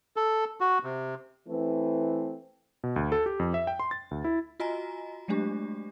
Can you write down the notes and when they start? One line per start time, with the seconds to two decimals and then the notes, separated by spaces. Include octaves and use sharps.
0.16 A4
0.60 F#4
0.83 C3
1.48 E3 A3 C4 B4
2.84 B2
2.96 D2
3.12 A4
3.26 G4
3.39 F2
3.54 E5
3.67 G5
3.80 C6
3.91 A6
4.11 D2
4.24 E4
4.60 F4 F#4 D#5 G#5 A#5
5.28 F#3 G#3 A3 D4 G4